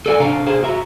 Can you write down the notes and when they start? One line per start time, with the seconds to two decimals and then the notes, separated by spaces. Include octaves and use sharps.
0.06 A4 A#4 D5 F5 F#5 G#5
0.20 C3 D4 F5 A#5
0.47 G#4 C5 F5
0.63 F#4 E5 A#5